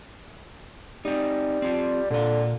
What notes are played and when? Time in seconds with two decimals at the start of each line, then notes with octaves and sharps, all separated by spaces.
1.05 G3 C4 D#4
1.62 C4 F4
2.10 A#2 D3 F4